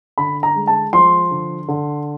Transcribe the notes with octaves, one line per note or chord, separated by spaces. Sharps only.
D3 B5
A#5
G#3
A5
F3 C6
D3
D3